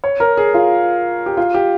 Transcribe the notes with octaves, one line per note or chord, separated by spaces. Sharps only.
C#5
A#4
G#4
F4
G4
F4
G4